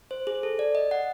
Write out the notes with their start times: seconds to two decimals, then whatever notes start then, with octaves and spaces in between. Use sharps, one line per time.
0.11 C5
0.27 G#4
0.43 A4
0.59 D5
0.75 D#5
0.91 F#5